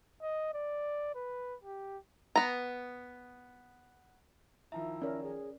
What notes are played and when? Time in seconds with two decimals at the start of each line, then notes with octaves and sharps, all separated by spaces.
0.22 D#5
0.54 D5
1.15 B4
1.63 G4
2.36 B3 A#5
4.72 D#3 F3 E4 E5 A#5
5.02 C#4 A#4 D5
5.22 G#4